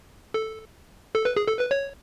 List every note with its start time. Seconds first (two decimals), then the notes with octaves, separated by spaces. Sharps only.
0.34 A4
1.15 A4
1.25 B4
1.36 G#4
1.48 A4
1.59 B4
1.71 C#5